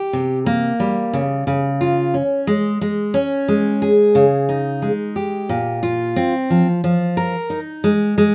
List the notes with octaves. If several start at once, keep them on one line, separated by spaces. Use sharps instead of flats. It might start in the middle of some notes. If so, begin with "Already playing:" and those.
Already playing: G4
C3
A#3
G3
C#3
C#3
F4
C#4
G#3
G#3
C#4
G#3
G#4
C#3
D#4
G#3
G4
A#2
F4
C4
F3
F3
A#4
D#4
G#3
G#3